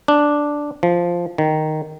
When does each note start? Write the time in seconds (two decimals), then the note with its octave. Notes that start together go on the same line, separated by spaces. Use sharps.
0.08 D4
0.83 F3
1.38 D#3